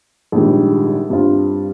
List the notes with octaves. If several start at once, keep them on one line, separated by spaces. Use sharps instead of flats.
A#1 G#2 D#3 G3
G2 G3 C4 F4